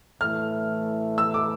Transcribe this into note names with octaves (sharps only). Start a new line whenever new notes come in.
A2 E3 A3 F6
E6
D6